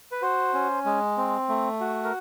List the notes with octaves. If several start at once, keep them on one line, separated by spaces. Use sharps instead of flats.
B4
F#4 C5
C#4
G#3
C4
A3
F#4
A#4